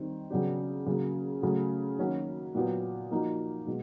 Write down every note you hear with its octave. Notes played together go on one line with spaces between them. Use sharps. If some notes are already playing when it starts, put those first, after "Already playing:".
Already playing: D#3 G3 C4
C#3 F#3 B3 D4 G4
C#3 F#3 A#3
C#3 F#3 A3
D#3 F#3 A#3 C#4 F#4
A#2 F#3 B3 E4 G4
F3 A#3 D#4 F#4
B2 G#3